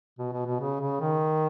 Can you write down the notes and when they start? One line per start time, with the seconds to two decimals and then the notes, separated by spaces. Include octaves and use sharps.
0.18 B2
0.33 B2
0.46 B2
0.60 C#3
0.80 C#3
1.01 D#3